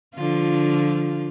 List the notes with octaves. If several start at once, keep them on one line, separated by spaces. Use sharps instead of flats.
D3 F3 F4